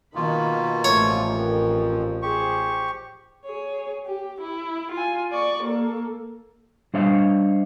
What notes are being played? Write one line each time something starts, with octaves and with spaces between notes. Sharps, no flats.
B2 D#3 A#3 F4 B5
A1 F3 A3 C#5
F2 A#4
G4 G#4 C5 C#6
G#4 C#5
G4
E4
F4 G#5
D5 C#6
A#3 A4
G3 D4 C5 C#5 D#5 F5